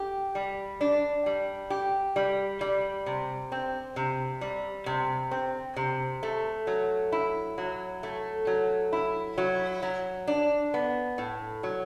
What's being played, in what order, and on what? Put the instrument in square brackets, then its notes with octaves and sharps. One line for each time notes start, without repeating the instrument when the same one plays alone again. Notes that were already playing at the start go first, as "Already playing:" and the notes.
Already playing: [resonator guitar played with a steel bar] G4
G3
D4
G3
G4
G3
G3
C3
C4
C3
G3
C3
C4
C3
A3
F#3
E4
F#3
A3
F#3
E4
F#3
F#3
D4
B3
A2
F#3